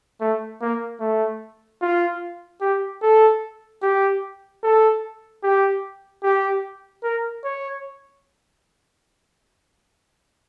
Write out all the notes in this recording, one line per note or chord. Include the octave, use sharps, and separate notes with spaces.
A3
A#3
A3
F4
G4
A4
G4
A4
G4
G4
A#4
C#5